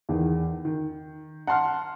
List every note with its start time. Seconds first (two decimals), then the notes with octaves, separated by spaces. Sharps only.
0.09 E2 D#3
0.65 D#3
1.47 F#5 A5 C6 F6